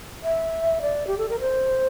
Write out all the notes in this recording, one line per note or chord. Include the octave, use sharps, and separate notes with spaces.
E5
D5
G4
A4
A#4
C5